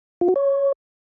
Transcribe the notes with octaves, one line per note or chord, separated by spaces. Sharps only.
F4
F#4
C#5